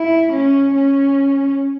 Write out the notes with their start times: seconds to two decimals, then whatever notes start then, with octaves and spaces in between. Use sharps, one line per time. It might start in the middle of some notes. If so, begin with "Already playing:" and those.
Already playing: E4
0.33 C#4
0.75 C#4